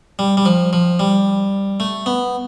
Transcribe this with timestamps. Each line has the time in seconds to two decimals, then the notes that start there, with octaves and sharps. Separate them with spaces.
0.19 G3
0.37 G3
0.45 F3
0.73 F3
1.00 G3
1.80 A3
2.06 B3